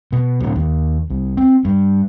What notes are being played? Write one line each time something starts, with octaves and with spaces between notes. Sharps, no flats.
B2
D1
D#2
C2
C4
G2